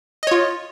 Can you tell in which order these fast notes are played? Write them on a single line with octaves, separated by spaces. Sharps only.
D#5 C#5 F4